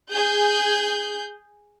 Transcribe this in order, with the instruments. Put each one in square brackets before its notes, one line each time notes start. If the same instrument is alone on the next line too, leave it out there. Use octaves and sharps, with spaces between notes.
[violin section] G#4 G6